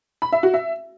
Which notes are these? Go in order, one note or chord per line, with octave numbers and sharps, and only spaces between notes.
B5
E5
F#4
E5